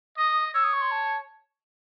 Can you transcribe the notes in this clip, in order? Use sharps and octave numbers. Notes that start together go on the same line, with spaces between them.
D#5 D#6
C#5 E6
D#6
C#6
C6
A5